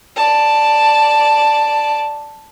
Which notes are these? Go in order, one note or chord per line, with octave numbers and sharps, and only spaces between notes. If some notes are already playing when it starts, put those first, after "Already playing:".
D5 A5